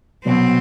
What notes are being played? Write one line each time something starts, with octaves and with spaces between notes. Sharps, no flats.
C2 B2 F#3 B3 C4